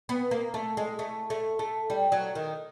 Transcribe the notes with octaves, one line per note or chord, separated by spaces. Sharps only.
B3
A#3
A3
G#3
A3
A3
A3
G3
F#3
D#3